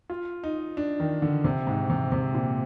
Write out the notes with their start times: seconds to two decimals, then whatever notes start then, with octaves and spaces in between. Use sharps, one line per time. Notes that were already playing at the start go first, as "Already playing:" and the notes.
0.10 F4
0.44 D#4
0.77 D4
1.00 D#3
1.22 D3
1.44 C3
1.67 G#2
1.90 C3
2.12 C3
2.34 A#2